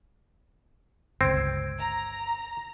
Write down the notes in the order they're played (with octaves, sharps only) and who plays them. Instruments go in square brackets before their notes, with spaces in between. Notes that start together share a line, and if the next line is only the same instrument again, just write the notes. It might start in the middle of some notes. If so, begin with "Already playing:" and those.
[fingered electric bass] G1 C#2 [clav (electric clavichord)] C4 [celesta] E6 G#6 D7
[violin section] A#5